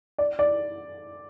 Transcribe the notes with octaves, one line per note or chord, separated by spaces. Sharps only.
D5
D5